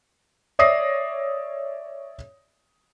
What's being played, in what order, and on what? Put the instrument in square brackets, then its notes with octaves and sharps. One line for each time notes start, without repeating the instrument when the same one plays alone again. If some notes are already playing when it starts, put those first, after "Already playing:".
[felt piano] C#5 D5 E5 D#6 A#6 C7